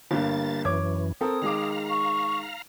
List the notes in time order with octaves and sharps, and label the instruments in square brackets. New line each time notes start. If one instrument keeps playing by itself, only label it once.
[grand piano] G1 G2 A#3 [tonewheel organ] A6
[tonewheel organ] F#2 E3 [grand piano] C#5 D6 G#6
[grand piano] C4 A4 A#4 [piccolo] D#6
[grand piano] D#3 G#3 D6 [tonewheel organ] F5 A#5
[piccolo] C#6